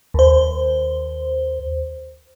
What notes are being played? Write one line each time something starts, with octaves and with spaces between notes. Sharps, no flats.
D#2 C5